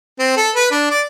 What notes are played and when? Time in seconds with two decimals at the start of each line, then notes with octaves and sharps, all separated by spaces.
0.19 C4
0.37 A4
0.56 B4
0.71 D4
0.90 D5